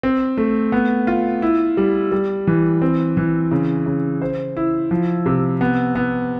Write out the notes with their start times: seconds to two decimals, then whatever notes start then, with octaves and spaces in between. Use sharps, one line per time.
0.03 C4
0.38 A3
0.72 B3
1.07 F4
1.42 E4
1.77 G3
2.12 G3
2.47 E3
2.82 C4
3.17 E3
3.52 C#3
3.86 C#3
4.22 C5
4.57 E4
4.91 F3
5.26 C3
5.61 B3
5.95 B3